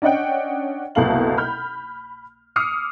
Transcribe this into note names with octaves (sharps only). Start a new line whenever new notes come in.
C#4 D4 D#5 F#5 G5
F#1 C2 B2 A4 F5 F#7
B5 F6 G6
D6 D#6 F6 C7 C#7